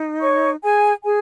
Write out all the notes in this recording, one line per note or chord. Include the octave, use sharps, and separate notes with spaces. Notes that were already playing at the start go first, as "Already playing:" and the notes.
Already playing: D#4
C#5 C#6
G#4 G#5
G#4 G#5